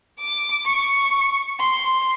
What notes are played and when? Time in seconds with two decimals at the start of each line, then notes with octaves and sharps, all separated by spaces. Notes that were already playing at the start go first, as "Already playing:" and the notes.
0.19 D6
0.66 C#6
1.60 C6